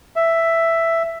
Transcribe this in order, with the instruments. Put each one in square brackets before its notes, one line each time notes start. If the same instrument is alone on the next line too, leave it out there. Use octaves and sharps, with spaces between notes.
[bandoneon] E5